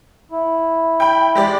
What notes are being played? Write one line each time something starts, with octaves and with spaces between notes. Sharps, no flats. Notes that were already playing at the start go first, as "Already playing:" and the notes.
E4
G5 B5
G#3 G4 D5